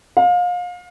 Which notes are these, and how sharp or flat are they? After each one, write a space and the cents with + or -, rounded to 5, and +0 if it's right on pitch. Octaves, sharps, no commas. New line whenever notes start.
F5 +30